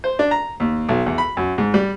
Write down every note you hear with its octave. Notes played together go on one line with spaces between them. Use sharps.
C5
D4
A#5
D#2
B1
E2
B5
F#2
G#2
G3